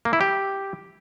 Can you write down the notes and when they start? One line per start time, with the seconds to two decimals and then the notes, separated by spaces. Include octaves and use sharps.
0.05 A#3
0.13 E4
0.21 G4